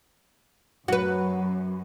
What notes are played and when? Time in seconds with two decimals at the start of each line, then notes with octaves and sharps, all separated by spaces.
0.88 F#2 F#3 F#4 B4